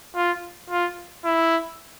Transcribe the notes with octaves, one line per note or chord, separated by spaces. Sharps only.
F4
F4
E4